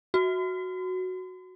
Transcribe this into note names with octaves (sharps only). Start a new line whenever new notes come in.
F#4